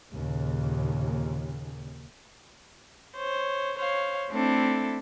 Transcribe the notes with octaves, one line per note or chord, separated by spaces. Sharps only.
D#2 A#2 C#3
C5 C#5
C5 C#5 F5
A3 C4 D4 E4 A4